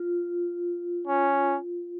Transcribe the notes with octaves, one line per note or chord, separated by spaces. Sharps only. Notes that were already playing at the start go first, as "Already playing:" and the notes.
Already playing: F4
C#4